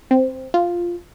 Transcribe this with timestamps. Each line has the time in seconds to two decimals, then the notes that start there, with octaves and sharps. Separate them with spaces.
0.11 C4
0.54 F4